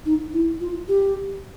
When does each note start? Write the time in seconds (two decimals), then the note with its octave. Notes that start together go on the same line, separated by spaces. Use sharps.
0.06 D#4
0.33 E4
0.61 F4
0.88 G4